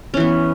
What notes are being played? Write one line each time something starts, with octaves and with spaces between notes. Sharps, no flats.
E3 B3 C#4